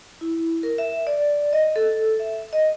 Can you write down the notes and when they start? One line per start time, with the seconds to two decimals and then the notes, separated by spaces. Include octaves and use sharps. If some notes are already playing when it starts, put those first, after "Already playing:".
0.21 E4
0.63 A#4
0.78 E5
1.07 D5
1.53 D#5
1.76 A4
2.20 E5
2.53 D#5